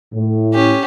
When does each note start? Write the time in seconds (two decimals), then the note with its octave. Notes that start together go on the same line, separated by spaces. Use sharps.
0.14 A2
0.54 C#4 G4